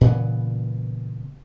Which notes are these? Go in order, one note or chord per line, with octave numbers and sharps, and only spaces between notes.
A#2 C#3 E3 B3